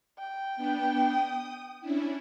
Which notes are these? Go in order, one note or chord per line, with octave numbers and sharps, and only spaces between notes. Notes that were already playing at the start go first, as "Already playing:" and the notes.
G5
B3 D4
D#6
C#4 D4 E4